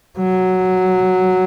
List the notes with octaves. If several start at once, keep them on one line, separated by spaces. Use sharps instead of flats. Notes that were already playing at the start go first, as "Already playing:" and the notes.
F#3